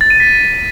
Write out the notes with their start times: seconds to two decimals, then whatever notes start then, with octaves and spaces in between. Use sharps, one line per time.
0.01 A6
0.10 D#7
0.20 B6